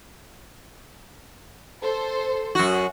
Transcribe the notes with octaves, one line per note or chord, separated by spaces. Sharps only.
A4 C5
F#2 F#4